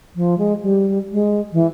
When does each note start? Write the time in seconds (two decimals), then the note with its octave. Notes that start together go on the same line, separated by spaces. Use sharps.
0.16 F3
0.38 G#3
0.62 G3
1.12 G#3
1.53 E3